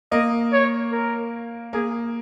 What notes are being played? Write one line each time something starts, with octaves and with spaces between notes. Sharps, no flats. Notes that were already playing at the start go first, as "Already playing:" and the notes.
A#3 D#5
C#5
A#4
A#3 G#4